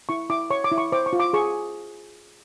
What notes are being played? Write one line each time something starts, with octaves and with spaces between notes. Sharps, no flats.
E4 C#6
E4 D6
C#5 C#6
D6
E4
C#6
C5 D6
C#6
F4
D6
G#4 C#6